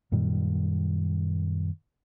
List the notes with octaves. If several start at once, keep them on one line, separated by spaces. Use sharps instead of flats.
F#2 A#2 D#3 G3